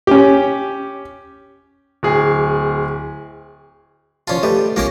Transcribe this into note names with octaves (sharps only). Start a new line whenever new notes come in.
C#4 G4
D1 G#4
F3 C#4 F4 D5 A5
G3 A3 G4 B4 D#5
A#1 G#3 A#3 C#4 F4 G4